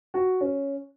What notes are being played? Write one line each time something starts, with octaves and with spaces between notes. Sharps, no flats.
F#4
C#4